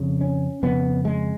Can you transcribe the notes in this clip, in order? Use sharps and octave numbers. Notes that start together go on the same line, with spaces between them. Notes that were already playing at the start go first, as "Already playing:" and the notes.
Already playing: F2 C#3
C#4
F2 C#3 B3
G#3